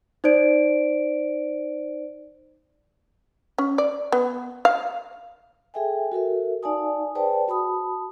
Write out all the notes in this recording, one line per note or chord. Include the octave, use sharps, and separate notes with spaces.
D#4 C5 D5 D7
C#4
D5
B3
F5
G#4 A4 E5 G5 G#5
F#4 A4 A#4 E5
D#4 D5 F5 G#5 A5 D#6
G#4 B4 C5 D5 G5 A5
F#4 A5 B5 D#6